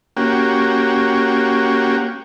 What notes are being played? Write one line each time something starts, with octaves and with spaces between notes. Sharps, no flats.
A#3 C#4 F#4 G4